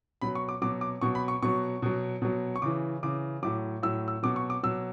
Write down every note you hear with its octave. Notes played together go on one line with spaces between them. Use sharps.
B2 F#3 B5
C#6
D6
B2 F#3 D6
D6
B2 F#3 C#6
B5
C#6
B2 F#3 C#6
B2 F#3
B2 F#3
C#6
C#3 E3 D6
C#3 E3 D6
A2 F#3 D6
A2 F#3 E6
E6
B2 F#3 D6
C#6
D6
B2 F#3 E6